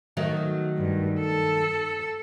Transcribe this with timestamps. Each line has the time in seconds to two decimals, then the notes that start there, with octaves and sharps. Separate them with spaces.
0.17 D#3 F#3 A3
0.77 G2
1.20 A4